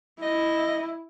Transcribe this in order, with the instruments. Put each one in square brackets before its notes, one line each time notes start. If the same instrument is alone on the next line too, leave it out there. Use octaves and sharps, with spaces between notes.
[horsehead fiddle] E4 [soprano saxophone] D#5